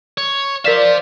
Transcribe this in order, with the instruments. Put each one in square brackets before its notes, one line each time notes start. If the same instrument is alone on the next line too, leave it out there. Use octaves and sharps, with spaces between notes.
[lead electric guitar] C#5
[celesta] A#4 B6 E7 [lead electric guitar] C5 F5 [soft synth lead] D5